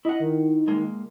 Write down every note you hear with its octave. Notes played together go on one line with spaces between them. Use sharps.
E4 D#5 F#5
D#3
C#2 G#3 A#3